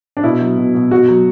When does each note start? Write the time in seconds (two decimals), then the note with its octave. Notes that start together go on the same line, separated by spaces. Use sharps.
0.17 D4
0.23 B2 E4
0.40 F#3
0.57 B2
0.74 B2
0.91 B2 F#4
1.08 F#3